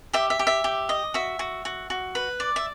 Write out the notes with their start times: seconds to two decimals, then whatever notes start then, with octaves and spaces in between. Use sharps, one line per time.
0.13 G4 E5
0.30 E5
0.39 G4
0.47 E5
0.64 G4
0.89 D#5
1.14 F#4 E5
1.39 F#4
1.65 F#4
1.90 F#4
2.15 B4
2.40 D5
2.56 E5